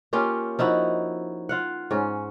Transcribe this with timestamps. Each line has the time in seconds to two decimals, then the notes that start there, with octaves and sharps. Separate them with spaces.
0.13 A#3 C#4 F4 G4
0.59 F3 D#4 E4 F#4
1.49 F4 F5 F#5
1.91 G#2 C#4